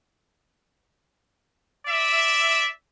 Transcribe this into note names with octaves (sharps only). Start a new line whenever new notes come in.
D5 E5